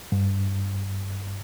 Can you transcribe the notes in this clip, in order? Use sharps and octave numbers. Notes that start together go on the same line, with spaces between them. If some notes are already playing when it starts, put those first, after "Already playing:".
G2